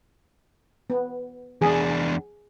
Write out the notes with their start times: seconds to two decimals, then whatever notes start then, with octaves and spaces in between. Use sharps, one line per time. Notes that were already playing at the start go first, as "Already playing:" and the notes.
0.90 B3
1.62 E2 D4 G#4